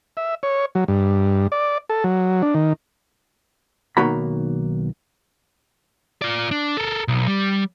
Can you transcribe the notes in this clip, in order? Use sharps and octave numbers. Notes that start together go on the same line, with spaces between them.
E5
C#5
F#3
G2
D5
A4
F#3
D4
D#3
B1 D#3 A#3 F#4 A#5 B5
F4 D5
D4
A4 A#4
B1
G3